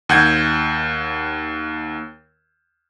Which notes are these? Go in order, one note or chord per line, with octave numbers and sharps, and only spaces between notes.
D#2 F#5 G6 G#6